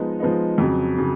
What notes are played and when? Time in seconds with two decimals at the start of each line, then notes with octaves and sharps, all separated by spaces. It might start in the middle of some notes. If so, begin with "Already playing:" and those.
Already playing: F3 G#3 B3 D#4
0.20 F3 G#3 B3 D#4
0.58 F2 C#3 F#3
0.98 C#3 F#3